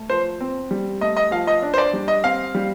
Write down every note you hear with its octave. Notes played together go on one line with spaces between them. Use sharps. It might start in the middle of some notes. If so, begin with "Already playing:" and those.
Already playing: A3
F3 C5
C4
G3
A3 D#5
D#5
F3 F5
D#5
D4
C5
D5
G3
D#5
C4 F5
G3